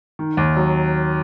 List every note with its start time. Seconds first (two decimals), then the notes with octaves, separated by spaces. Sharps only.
0.19 D#3
0.37 D#2
0.57 F#3